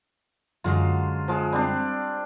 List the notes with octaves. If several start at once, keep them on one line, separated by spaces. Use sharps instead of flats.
F#2 D3 F#3 G#3 F4
F3 G#3
G3 C4 D4